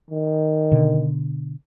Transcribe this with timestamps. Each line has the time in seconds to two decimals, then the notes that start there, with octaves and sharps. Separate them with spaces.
0.11 D#3
0.71 B2 D3